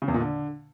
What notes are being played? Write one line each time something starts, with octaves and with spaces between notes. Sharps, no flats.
C#3
E2
A#2
D3